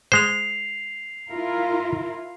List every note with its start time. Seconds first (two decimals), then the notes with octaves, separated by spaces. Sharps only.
0.12 G#3 C5 C7 F7
1.31 E4 F4 A#4